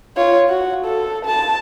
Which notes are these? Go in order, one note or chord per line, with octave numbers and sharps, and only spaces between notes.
F4 C#5
F#4
A4
A5